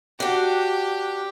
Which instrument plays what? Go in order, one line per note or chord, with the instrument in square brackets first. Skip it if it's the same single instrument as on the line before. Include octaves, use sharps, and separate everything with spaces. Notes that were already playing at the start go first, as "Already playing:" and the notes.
[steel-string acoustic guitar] D4 F#4 [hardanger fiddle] G4